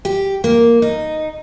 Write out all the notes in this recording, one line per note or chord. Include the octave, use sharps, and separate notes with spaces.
G4
A#3
D#4